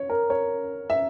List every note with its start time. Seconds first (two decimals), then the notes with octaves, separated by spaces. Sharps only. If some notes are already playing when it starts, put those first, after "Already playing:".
Already playing: C#5
0.10 A#4
0.30 C#5
0.90 E5